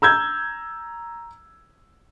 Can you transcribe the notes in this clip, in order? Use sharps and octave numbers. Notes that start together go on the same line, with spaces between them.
A#5 E6 G6 G#6